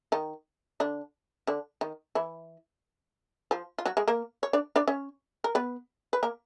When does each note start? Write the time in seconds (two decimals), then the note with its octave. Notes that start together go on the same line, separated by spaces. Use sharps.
0.12 D#3 D#4
0.80 D3 D4
1.47 D3 D4
1.81 D#3 D#4
2.15 E3 E4
3.51 F3 F4
3.78 F4
3.86 F#3 F#4
3.97 G#3 G#4
4.08 A#3 A#4
4.43 C#5
4.53 D4 D5
4.76 D4 D5
4.88 C#4 C#5
5.44 A#4
5.55 B3 B4
6.13 B4
6.23 A#3 A#4